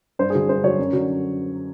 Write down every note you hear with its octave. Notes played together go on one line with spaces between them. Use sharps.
G2 C5
G#4
D3 F#3
G2 C5
D3 F#3 C#5
F#2
D3 F#3